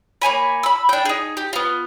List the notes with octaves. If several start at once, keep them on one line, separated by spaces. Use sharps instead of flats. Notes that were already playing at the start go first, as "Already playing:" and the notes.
A#3 C#5 G#5 B5
B5 E6
D4 G5
D#4 G#4
G4
B3 F4